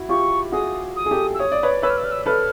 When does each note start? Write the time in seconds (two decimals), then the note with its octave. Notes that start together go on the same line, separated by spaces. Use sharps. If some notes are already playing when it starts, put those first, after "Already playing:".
Already playing: E4 F#4
0.09 F4 G4 C#6
0.52 F#4 G#4 D#6
0.96 D#6
1.06 G#4
1.11 G4 A4
1.34 E6
1.39 C#5 D#6
1.52 D5
1.63 B4 C#5
1.82 B4 C#5 E6
1.90 F6
1.97 E6
2.04 F6
2.11 E6
2.26 A4 B4 F6